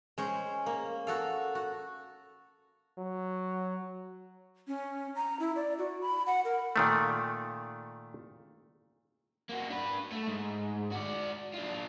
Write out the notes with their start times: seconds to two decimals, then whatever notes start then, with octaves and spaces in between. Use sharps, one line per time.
0.18 G#3 C#4 C5
0.66 A#3
1.07 F#4 A4 F5
1.55 F#4
2.98 F#3
4.68 C#4
5.15 A#5
5.40 E4
5.56 D5
5.78 F#4
6.01 B5
6.26 F#5
6.45 A#4
6.76 A#2 D#3 A3
9.49 A#3 F#4
9.70 D4 B4
10.12 A3
10.28 G#2
10.91 F#4 D5
11.53 D4 F4